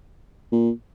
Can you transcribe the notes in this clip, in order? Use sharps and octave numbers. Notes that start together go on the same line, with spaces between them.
A#2